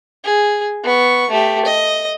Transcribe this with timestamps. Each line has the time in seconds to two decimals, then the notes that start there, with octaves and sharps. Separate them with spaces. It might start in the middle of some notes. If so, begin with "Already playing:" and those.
0.24 G#4
0.84 B3 C#6
1.30 A3 G4
1.65 D#5